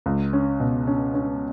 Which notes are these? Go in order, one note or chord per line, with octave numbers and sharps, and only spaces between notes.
C#2
C#4
B2
C#4
C#4